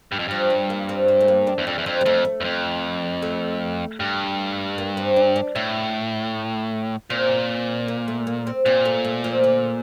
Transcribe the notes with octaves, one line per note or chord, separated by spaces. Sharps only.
G2
F2
G2 F3
G3
A#3
C4
C4
A3
A#3
D4
E2
F2 D4
E2
F2 C4
G3
F2 A3
A3
E2
F2
A3
G2
A#3
C4
D4
D4
A2 E4
A#2 C4
A#3
A3
A#3
C4
A#2 C4
A3
A3
F3
D3